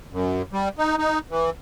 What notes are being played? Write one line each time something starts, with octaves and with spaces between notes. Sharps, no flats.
F#2
G3
D#4
D#4
E3